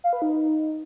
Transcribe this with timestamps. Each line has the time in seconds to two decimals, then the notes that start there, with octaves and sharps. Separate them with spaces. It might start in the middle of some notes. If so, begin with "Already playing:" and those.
0.04 F5
0.13 B4
0.22 D#4